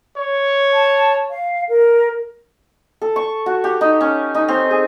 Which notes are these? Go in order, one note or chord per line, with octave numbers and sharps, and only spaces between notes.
C#5
A5
F5
A#4
A4
C#6
F#4
G4
D#4
C#4
D#4
C4
G#4